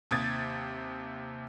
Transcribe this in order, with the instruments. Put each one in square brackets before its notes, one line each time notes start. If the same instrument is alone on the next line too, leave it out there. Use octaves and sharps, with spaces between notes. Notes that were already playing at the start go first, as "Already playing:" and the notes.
[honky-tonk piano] D#2 C3 D#6 G#6 A6